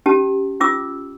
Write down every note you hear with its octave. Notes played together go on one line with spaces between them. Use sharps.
C#4 G4 A5
C#4 F4 D6 E6